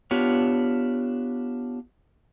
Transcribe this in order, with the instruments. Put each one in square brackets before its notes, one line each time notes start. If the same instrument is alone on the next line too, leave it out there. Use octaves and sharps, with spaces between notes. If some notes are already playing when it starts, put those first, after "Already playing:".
[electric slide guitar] B3 D4 F4 G4 C#5